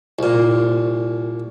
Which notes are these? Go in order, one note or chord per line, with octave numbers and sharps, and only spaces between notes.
C2 A#2